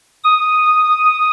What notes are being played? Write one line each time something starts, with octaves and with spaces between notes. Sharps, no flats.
D#6